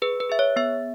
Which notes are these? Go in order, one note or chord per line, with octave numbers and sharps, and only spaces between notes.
G#4 B4
B4
G#4 E5
C#5
B3 E5